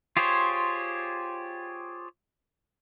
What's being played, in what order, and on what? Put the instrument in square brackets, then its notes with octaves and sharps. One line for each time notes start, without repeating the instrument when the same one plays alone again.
[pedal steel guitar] F4 G4 G#4 C5 C#5